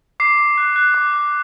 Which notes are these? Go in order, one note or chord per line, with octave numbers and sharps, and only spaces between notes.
D6 C7
D6
F#6
F#6
D6
D6